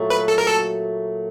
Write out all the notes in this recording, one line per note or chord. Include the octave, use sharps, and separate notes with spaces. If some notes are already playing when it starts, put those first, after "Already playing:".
Already playing: A#2 F#3 A3
B4
A4
A#4
A4